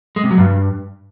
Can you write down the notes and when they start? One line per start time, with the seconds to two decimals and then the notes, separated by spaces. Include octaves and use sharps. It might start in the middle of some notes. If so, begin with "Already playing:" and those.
0.16 G#3
0.24 C3
0.31 F#3
0.38 G2